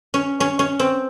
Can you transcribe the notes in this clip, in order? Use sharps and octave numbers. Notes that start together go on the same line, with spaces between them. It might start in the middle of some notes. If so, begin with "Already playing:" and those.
C#4
C#4
C#4
C4